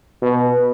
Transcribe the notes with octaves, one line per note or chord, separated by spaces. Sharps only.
B2